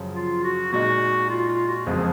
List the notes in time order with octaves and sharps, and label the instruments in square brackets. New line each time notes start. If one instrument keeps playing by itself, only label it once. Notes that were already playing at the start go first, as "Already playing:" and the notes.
Already playing: [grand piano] F#2 C#3 F3
[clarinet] F4
F#4
[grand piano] A#2 G#3 D#4 [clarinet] F#4
[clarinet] F4
F4
F#4
[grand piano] F#1 F2 F3 G#3 [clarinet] G#4